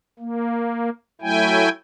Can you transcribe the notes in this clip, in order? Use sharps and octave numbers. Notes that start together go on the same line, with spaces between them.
A#3
F#3 A3 E4 G5 G#5